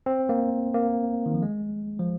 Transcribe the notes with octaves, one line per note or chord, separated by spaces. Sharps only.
C4
A#3
A#3
D#3
F3
G#3
F3